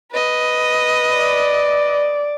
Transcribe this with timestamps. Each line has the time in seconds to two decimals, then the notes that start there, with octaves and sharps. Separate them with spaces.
0.12 B4 D#5
1.16 D5